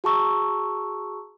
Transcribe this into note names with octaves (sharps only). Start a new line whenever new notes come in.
F#4 G#4 A5 A#5 C#6 E6